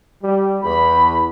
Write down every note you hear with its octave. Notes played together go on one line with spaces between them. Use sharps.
G3
E2 B5